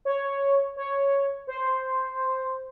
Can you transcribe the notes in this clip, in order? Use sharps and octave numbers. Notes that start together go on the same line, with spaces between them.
C#5
C#5
C5